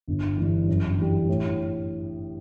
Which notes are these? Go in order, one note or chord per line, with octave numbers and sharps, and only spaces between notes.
G1
G2 E3
F#2
E3 G3
A2